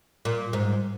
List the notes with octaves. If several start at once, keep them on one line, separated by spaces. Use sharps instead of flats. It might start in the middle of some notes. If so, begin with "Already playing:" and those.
A#2
G#2